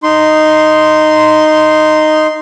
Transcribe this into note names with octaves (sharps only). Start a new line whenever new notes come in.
D#4 C6